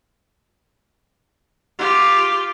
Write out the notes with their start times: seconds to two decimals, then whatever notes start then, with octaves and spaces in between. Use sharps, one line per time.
1.78 F4 G4